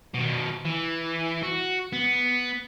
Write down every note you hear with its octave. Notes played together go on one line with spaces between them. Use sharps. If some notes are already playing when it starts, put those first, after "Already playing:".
B2 D#3
E3
F#4
B3